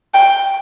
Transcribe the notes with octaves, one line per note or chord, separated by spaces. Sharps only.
G5